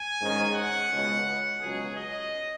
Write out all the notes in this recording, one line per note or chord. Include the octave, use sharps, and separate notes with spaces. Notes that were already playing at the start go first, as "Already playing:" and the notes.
Already playing: G#5
G#2 D#3 G#3 C#4
F#5
C#2 B2 G#3
C#2 B2 F#3 C#4 G#4
D#5